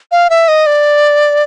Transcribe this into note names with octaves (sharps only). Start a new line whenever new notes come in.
F5
E5
D#5
D5